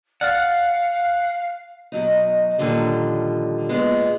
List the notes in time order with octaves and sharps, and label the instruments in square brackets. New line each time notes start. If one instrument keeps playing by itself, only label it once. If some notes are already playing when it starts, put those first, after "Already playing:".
[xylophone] D5 F6 A6 [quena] F5 [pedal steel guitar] F#5
[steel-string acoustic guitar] B2 F#3 D#4
A#2 D3 D#3 F3 G3
A#2 G#3 B3